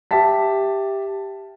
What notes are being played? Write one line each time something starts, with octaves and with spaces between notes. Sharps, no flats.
G4 E5 A5 B6